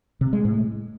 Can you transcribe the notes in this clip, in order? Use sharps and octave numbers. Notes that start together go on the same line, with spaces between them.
C3
G#3
A2